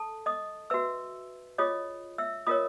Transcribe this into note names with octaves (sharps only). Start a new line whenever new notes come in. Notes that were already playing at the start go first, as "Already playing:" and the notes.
Already playing: A4 A5
D#5 D#6
F#4 B4 E5 E6
F4 G#4 C#5 D#5 D#6
E5 E6
F4 A#4 C#5 D#5 D#6